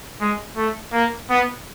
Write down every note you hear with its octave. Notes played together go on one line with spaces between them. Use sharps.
G#3
A3
A#3
B3